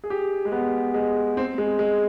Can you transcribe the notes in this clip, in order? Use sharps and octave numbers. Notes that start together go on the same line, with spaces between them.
G#4
G4
G#3
B3
G#3
C4
G#3
G#3